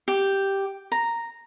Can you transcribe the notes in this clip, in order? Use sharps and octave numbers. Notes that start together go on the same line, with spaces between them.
G4
A#5